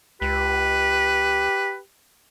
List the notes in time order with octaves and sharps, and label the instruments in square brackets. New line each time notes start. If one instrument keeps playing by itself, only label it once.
[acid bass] C#2 [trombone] G4 [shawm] B4